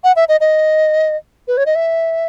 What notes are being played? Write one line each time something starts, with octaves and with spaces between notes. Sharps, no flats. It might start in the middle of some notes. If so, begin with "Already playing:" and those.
F#5
E5
D#5
D#5
B4
C#5
D#5
E5